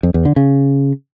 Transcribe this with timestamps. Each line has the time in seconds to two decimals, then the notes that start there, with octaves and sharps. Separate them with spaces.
0.03 F2
0.14 E2
0.25 D3
0.36 C#3